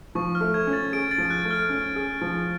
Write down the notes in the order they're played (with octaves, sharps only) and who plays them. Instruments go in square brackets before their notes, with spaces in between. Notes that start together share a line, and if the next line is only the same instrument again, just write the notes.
[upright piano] F3 [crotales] C#6
[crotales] F6
[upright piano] A3
[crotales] G#6
[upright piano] C#4
[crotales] A6
[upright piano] G#4 [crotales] D7
[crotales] A6
[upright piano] F3
[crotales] F#6
[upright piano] A3
[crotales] F6
[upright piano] C#4
G#4
F3